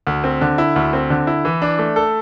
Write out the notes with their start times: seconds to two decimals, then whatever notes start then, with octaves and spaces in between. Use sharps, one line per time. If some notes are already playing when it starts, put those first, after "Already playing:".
0.07 D2
0.24 C4
0.41 D3
0.58 E4
0.76 D2
0.93 C4
1.10 D3
1.27 E4
1.45 E3
1.62 D4
1.79 A3
1.96 A4